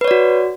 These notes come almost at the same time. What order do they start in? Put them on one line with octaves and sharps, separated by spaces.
B4 C#5 D5 F#4